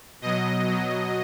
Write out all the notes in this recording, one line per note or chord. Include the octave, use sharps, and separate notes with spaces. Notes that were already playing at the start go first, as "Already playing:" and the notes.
B2 F#3 D#5
B2 F#3